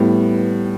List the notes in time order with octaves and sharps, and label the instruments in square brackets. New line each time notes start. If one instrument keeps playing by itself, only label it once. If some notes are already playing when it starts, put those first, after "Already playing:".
Already playing: [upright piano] A2 G3 B3